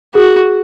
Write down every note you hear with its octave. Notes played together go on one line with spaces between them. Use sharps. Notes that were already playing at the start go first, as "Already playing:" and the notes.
F#4 G#4